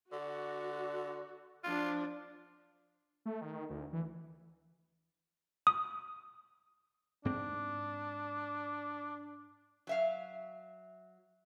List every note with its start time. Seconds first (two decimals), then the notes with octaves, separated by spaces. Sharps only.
0.12 D3 F#4
1.64 F3 D4 F4
3.25 A3
3.41 D#3
3.70 D2
3.93 E3
5.67 D#6
7.25 G#2 C4 D4
9.87 F#3 E5 F5